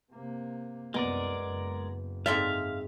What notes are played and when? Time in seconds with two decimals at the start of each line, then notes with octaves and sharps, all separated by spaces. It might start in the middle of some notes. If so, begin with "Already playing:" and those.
0.12 C3 A#3
0.94 C2 F#2 G#3 B3 A#4 D5
1.44 F#1
2.26 G#2 C4 E5 F5 A5